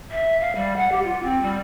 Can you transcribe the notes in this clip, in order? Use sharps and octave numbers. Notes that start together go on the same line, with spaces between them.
E5
F5
G3
F#5
G4
F4
C4
G3